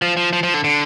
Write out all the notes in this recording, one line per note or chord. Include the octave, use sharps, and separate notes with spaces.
F3
F3
F3
F3
D3
D3